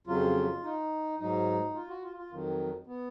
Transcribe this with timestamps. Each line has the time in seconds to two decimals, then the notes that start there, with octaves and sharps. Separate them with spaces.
0.07 F2 C#3 F#3 F4
0.63 D#4
1.19 G#2 F#3 D#4
1.74 F4
1.88 F#4
2.03 F4
2.17 F4
2.31 F2 D#3 F#3
2.87 B3